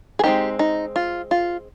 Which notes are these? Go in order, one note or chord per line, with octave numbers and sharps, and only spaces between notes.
G#4
G#3 C4 D#4 G4
D#4
F4
F4